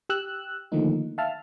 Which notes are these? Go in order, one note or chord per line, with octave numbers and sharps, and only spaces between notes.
G4 E6 F#6
D3 D#3 F3 A3 A#3 D#4
E5 F5 A5 F6